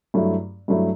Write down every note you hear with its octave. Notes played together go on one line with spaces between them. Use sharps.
G2 F#3 A3 E4
G2 F#3 A3 E4